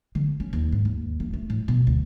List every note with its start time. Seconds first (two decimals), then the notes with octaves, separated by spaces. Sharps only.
0.15 D3
0.40 C#4
0.53 D#2
0.72 G#2
0.85 D#2
1.20 A#3
1.33 A3
1.50 A2
1.68 B2
1.87 D2